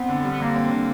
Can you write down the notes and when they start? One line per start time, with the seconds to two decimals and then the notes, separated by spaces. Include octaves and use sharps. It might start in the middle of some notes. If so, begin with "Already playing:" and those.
Already playing: B3 C4
0.09 D3
0.24 G3
0.30 B3
0.40 D3 A#3
0.56 C4
0.71 D3